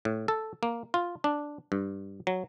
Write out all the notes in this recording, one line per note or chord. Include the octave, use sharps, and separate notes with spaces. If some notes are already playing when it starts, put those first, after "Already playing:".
A2
A4
A#3
F4
D4
G2
F#3